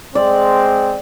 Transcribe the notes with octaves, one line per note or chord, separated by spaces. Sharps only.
G#3 C4 D5